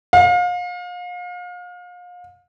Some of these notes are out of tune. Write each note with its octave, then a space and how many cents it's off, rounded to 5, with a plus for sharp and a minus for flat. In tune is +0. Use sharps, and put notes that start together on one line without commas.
F5 +35